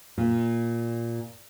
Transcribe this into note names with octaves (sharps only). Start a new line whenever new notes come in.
A#2